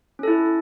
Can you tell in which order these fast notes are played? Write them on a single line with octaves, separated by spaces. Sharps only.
C#4 A4 E4